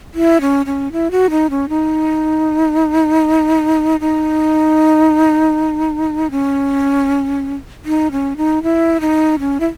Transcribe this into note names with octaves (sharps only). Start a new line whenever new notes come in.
E4
C#4
C#4
E4
F#4
D#4
C#4
D#4
D#4
C#4
D#4
C#4
D#4
E4
D#4
C#4
E4